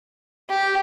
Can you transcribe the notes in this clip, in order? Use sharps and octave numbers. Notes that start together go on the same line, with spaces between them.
G4